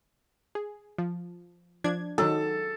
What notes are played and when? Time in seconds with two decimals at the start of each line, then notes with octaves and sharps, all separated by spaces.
0.55 G#4
0.98 F3
1.84 F3 D4 G#6
2.18 D#3 F#3 D#4 A4